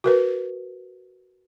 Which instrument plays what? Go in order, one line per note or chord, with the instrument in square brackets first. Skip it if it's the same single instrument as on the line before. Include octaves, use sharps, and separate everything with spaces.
[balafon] F#4 A#4 B4